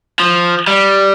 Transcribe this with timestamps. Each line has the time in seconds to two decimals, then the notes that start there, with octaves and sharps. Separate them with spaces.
0.20 F3
0.68 G3